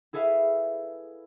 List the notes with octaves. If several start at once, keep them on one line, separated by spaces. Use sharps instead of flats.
E4 G#4 A4 B4 E5 F5